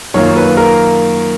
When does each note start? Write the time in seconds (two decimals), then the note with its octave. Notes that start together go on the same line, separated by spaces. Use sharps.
0.14 F#2 D#3 A#3 F4 C#5
0.36 B4
0.57 A#4